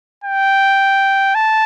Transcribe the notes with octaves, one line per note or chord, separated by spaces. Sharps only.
G5
A5